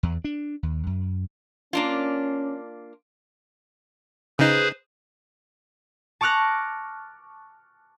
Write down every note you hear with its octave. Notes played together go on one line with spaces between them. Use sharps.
E2
D4
D#2
F#2
A#3 C#4 D4 F4
C#3 D#4 G#4 B4 C5
A5 C#6 D6 F6 F#6 A#6